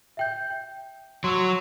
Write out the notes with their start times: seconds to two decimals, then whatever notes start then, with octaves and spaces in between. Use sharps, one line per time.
0.17 E5 G5 G6
0.50 G5
1.24 F#3 C6 C#6 E6